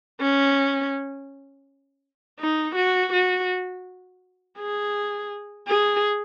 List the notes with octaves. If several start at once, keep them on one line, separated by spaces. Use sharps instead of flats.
C#4
D#4
F#4
F#4
G#4
G#4